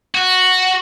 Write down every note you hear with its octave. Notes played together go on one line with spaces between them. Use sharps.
F#4